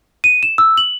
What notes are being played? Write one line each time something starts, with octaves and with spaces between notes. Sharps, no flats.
D#7
E7
E6
F#7